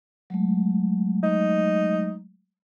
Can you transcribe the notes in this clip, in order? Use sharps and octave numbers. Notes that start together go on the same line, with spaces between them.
F#3 G#3 A3
D#4